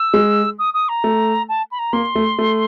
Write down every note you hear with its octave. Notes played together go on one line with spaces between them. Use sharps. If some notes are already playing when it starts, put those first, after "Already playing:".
Already playing: E6
G#3
D#6
D#6
A#5
A3
A5
B5
A#5
A#3 C6
A3
A3